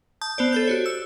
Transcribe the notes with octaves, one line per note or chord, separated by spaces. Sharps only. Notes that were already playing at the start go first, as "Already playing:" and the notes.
A5 D#6 G6
B3 C5 D5
A4 C5 G6
F#4 G4 C#5
E6